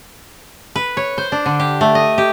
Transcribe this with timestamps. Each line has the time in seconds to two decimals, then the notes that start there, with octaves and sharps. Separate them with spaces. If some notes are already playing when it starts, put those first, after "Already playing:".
0.76 B4
0.97 C#5
1.18 C5
1.32 D4
1.46 D3
1.60 G4
1.81 A3
1.95 D#5
2.18 G4